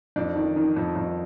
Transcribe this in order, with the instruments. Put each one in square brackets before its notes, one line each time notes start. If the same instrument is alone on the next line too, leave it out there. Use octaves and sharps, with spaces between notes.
[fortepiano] F2 D4
D#3
D#3
F2
F2